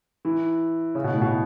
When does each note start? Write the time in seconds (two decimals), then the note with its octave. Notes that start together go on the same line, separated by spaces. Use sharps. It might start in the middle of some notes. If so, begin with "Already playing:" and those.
0.25 E3
0.95 C#3
1.04 B2
1.13 A2
1.22 B2